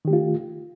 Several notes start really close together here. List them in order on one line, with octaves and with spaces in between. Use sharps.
D#3 G4 A3 F4